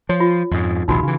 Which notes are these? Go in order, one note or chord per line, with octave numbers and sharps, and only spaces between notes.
F3 C#5
F4
F2 G#2
A#1 D#2 C3 D#4 F#4 B5
C#3 E3